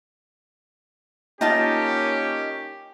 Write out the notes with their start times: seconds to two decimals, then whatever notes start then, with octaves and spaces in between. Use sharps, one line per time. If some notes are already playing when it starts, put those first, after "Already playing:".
1.41 A#3 C#4 D#4 F4 G4 A5